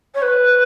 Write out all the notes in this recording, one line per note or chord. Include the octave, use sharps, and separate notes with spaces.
C#5
B4